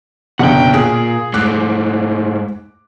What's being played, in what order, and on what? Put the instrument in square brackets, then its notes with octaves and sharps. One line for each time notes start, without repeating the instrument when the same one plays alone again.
[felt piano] F#1 B2 D3 [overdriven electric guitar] F#5 G5
[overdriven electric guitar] A#2 [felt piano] G#4
[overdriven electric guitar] G#2 A3 [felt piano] D6 F#6